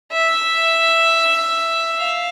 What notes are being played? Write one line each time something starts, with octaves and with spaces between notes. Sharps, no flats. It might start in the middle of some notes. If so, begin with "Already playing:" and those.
E5
F5